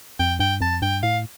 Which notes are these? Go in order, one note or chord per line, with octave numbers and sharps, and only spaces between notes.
F2 G5
G2 G5
F2 A5
G2 G5
A2 F5